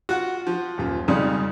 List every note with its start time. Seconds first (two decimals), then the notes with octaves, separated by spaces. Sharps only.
0.09 F4 F#4 F#5
0.47 F3
0.78 D#1 F#2 F4
1.08 F2 G#2 C#3 G3